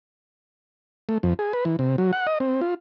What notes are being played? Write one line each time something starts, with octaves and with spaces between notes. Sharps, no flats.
A3
F2
G#4
B4
E3
C3
F#3
F#5
D#5
C4
F4